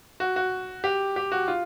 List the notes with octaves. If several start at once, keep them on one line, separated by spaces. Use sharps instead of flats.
F#4
F#4
G4
G4
F#4
F4